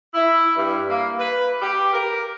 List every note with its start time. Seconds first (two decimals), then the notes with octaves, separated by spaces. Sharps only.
0.14 E4
0.56 G2
0.89 A#3
1.19 B4
1.62 G4
1.93 A#4